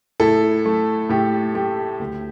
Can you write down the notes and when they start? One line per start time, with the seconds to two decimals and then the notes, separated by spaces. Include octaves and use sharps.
0.20 A2 E4 A4
0.65 A3
1.09 A2 G4
1.54 A3 G4
1.99 D2